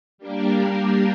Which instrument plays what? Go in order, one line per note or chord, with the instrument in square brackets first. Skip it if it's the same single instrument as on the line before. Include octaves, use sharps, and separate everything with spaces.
[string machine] G3 A#3 D4 G4 A#4